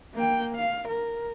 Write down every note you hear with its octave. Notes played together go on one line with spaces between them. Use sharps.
A#3 G5
F5
A#4